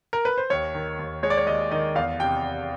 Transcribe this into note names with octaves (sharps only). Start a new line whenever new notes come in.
A#4
B4
C5
D#2 C#5
D#3
D#2
G#3 C#5
D5
C#5
D#2 D#5
D#3 D#5
E2 F5
C3 G5